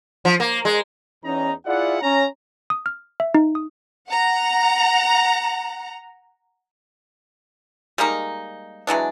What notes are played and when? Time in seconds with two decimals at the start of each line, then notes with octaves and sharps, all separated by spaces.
0.25 F3
0.40 A#3
0.65 G#3
1.24 E2 C#4 D#4 A#5
1.66 E4 F4 G#4 D5 E5 F#5
2.01 C#4 A#5
2.70 D#6
2.86 F6
3.20 E5
3.35 D#4
3.55 D#6
4.09 F#5 A#5
7.98 G3 G#3 A#3 D#4
8.87 E3 F#3 G#3 D4